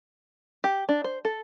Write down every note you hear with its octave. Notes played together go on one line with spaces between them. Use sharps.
G4
D4
C5
A4